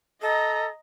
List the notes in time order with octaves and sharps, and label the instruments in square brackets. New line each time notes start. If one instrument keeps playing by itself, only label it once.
[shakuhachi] A4 [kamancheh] D#5 A#5